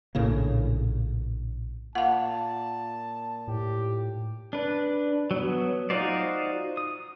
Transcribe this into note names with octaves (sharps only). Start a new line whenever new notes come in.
A#1 A2 C#3 A#3
A#2 F5 F#5 A5
A2 G4
D4 B4
F#3 B3
D#4 F4 F#4 C5 D5
D#6